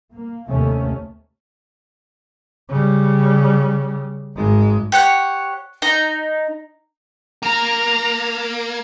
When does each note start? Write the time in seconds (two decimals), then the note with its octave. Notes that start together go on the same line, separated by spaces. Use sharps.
0.13 A#3
0.49 D#2 C3 D#3 A3 C#4
2.69 C#3 G3
4.36 G#1 G#3
4.92 G4 C#5 F#5
5.82 D#4 A#5
7.43 A#3 A#5